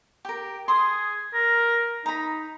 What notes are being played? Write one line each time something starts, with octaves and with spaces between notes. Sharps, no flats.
G4 A#4
G#4 C6 D#6
A#4
D#4 A#5 B5